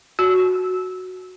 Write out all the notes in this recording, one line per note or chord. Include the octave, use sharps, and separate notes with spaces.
F#4